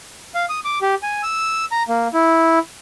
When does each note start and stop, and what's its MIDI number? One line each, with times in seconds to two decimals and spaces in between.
0.35 0.45 77
0.49 0.60 87
0.65 0.79 86
0.82 0.95 67
1.03 1.22 80
1.23 1.65 88
1.72 1.83 82
1.89 2.08 58
2.14 2.59 64